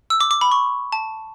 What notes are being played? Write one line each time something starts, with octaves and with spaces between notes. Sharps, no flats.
E6
D6
D6
B5
C#6
A5